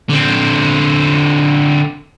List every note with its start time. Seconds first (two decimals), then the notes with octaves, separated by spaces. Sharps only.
0.10 D3 C4